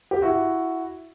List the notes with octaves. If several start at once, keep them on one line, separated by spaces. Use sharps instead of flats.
G4
E4 F#4